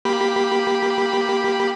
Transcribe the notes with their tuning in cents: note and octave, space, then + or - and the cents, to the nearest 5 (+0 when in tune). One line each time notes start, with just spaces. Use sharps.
A#3 +0 G4 +0 B5 -5